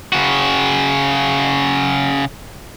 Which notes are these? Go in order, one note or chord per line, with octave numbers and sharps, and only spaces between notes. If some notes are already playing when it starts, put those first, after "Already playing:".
C#3 F#4